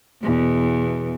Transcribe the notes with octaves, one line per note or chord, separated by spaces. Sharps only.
E2 B2